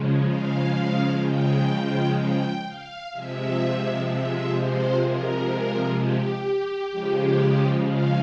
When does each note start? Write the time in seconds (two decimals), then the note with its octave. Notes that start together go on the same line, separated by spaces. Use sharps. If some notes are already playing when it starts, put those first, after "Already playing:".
Already playing: C#3 F3 G#3
0.27 F5
1.21 G5
2.17 G5
2.64 F5
3.12 C3 F3 G#3 E5
4.07 E5
4.54 C5
5.02 A#4
5.97 G4
6.92 C#3 F3 G#3
7.87 F5